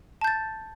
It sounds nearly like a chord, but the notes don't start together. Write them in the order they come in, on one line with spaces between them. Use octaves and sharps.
A5 G6 A6